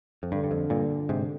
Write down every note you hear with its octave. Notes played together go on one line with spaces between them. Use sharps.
F2
G2 D3
G2
F2
G2 A#2
G#2 C3